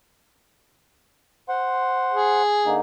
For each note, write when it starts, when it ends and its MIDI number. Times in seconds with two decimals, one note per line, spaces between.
1.49 2.42 72
1.49 2.42 78
1.49 2.42 84
2.12 2.80 68
2.66 2.81 50
2.66 2.81 58
2.66 2.81 63